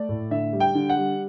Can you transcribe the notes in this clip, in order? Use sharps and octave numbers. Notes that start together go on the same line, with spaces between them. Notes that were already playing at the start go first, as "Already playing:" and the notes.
Already playing: A3 D5
A2
D3 E5
G3
G5
D3
F#5
G3